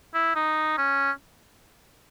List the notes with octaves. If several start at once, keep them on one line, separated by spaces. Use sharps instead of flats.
E4
D#4
C#4